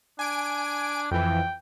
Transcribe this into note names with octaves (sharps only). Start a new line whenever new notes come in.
D4 G#5 D7
F2 E3 G5